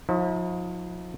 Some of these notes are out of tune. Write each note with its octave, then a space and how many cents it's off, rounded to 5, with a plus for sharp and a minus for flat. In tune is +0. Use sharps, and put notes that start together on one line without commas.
F3 +40 E4 -45